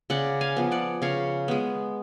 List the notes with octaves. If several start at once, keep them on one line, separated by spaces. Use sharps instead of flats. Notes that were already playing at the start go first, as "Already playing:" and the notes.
C#3 D5 F#5
F5 G#5
F3 B3
D5 F#5
C#3 C#5 F5
G#3 B3